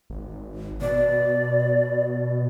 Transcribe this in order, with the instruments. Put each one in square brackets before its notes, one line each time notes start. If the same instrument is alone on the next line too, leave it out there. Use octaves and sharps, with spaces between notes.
[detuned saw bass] G#1
[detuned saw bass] B2 [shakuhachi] D5